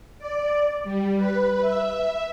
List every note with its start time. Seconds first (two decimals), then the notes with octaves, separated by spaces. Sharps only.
0.18 D5
0.84 G3
1.16 B4
1.61 E5